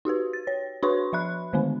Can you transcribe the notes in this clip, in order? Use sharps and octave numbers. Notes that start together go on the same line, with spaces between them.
D#4 F#4 G4 B4
A6
C#5
D4 F#4 B4 C#5 C6 C#6
F3 E5 B5 F#6
D3 D#3 G#3 B3 D4